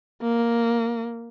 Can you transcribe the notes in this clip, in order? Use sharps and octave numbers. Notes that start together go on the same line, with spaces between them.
A#3